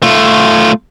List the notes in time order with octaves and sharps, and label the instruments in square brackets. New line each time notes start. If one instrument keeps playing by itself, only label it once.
[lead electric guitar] A3 F4